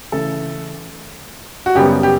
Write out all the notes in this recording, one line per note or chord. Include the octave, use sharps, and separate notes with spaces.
C#3 E3 A3 A4
F#4
F#2 C#3 G3 B3 G4
G4